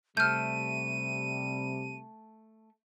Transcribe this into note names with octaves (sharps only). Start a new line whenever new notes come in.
C3 G3 A3 F6 G6 D#7